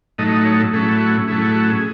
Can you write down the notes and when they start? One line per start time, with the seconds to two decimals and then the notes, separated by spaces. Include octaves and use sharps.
0.18 A2 F#3 A3 D#4 D#5
0.32 D#5
0.45 C#5
0.60 A4
0.73 A2 F#3 A3 C#4 E4 G#4
1.01 F#4
1.28 A2 F#3 A3 C#4 E4 G#4
1.41 G#4
1.56 F#4
1.70 G#4